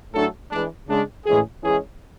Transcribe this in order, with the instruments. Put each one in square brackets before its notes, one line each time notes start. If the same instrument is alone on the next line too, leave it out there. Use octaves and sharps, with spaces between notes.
[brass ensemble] A2 F#3 A3 D4 A4
E3 G#3 D4
C#3 G#3 D4
A2 E3 G#3 C#4 G#4
E3 G#3 C#4 E4 G#4